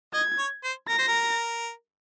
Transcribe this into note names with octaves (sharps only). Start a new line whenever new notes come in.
D#5 G#6
C#5
C5
A#4 A#6
C5
A#4